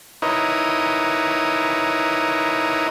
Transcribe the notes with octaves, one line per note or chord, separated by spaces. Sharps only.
D#4 E4 A#4 B4 C#5 D#5